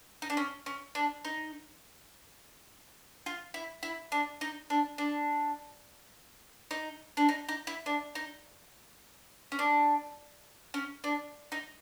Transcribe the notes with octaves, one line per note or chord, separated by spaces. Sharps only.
D#4
D4
C#4
C#4
D4
D#4
F4
E4
E4
D4
D#4
D4
D4
D#4
D4
D#4
D#4
E4
D4
D#4
C#4
D4
C#4
D4
D#4